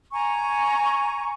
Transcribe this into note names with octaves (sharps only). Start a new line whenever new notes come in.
G#5 A#5 C#6